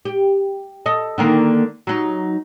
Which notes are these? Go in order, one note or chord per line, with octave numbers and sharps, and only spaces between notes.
G4
A4 D#5
D3 D#3 A#3
F#3 D#4